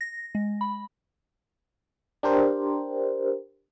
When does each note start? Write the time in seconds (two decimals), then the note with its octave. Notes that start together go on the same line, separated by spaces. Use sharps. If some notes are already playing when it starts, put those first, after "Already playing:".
0.01 A#6
0.35 G#3
0.61 B5
2.23 D4 G4 A#4 C5